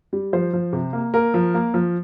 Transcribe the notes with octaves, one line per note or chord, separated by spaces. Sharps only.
G3
F3 C5
F3
C3
A#3
A#3 A#4
F3
A#3
F3